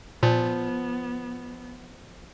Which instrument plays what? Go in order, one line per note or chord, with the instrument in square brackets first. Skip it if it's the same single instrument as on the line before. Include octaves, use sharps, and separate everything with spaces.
[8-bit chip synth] A#2 [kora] F3 [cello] B3